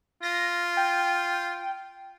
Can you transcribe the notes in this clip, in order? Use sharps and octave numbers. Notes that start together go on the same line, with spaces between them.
F4 A#6
G5